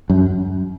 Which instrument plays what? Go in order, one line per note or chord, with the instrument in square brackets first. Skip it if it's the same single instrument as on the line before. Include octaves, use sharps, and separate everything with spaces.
[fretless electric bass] F#2